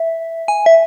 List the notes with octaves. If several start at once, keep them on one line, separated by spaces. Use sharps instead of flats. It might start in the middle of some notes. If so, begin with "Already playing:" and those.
Already playing: E5
G#5
E5